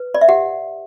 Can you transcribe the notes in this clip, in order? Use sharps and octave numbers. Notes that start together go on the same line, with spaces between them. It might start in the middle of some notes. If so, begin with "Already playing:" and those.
Already playing: B4
D5
E5
G4 F#5